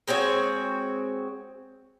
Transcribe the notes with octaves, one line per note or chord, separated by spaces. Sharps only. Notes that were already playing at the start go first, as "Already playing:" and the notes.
G#3 C4 F#4 C#5